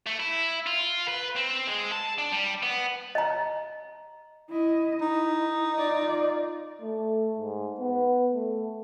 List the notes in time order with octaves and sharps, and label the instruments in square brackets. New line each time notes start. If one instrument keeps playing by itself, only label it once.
[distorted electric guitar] A3
E4
F4
B4
C4
G#3
A5
D4
G3
B3
[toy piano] D#5 A#5
[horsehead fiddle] E4 D#5
[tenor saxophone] D#4 [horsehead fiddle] E4
[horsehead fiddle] F4 D5
[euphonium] A3
G#2
B3
A3